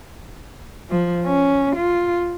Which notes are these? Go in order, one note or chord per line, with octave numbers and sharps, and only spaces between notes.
F3
C#4
F4